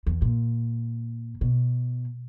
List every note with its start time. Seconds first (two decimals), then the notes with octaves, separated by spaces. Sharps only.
0.07 E2
0.22 A#2
1.41 B2